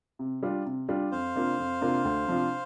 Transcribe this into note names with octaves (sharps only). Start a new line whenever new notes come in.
C3
G3 D4 F4
C3
G3 D4 F4
F2 C5 F5
C3 A#3 D4 F4
F2
C3 A#3 D4 F4
D2
C3 F3 D4 F4